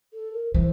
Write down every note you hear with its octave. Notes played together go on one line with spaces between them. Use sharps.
A4
A#4
E3 C5